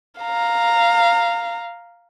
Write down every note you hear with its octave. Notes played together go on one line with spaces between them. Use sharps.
F5 A#5